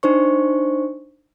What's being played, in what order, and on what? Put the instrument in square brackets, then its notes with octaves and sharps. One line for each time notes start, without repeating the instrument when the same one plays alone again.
[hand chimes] D4 D#4 C5 C#6